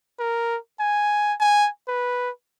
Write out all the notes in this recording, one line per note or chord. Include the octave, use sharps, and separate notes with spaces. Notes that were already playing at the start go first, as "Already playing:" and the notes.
A#4
G#5
G#5
B4